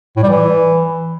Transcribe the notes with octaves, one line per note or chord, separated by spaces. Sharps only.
A2
G3
E3